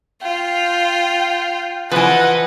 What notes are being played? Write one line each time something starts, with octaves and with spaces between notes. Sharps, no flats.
F4 G5
E3 F3 B4 D#5 F#5